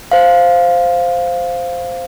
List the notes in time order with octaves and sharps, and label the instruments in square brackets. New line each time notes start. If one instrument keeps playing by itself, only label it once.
[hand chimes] C5 F5